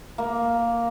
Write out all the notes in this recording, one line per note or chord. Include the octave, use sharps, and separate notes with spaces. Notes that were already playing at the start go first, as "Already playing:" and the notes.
A#3